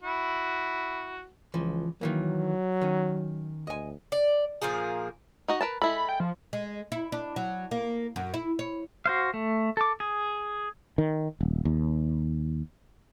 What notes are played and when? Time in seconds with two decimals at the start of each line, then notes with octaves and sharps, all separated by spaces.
0.02 E4 F#4
1.54 C#2 E3 F3
2.01 D#3 E3 F#3 A#3
2.81 D#3 C#4
3.67 D2 D#5 G#5
4.12 D5
4.62 A#2 F3 A#3 G#4
5.48 D#4 F#4 D#5
5.61 A#4 B4 A5
5.82 G#3 E4 A4 B5
6.09 G5
6.20 F3
6.53 G#3
6.92 E4
7.12 D4
7.36 F#3
7.71 A#3
8.16 F#2
8.34 E4
8.59 C#5
9.06 F#4 C5 F5
9.34 A3
9.77 A4 D6
10.00 G#4
10.98 D#3
11.41 D#1
11.65 D#2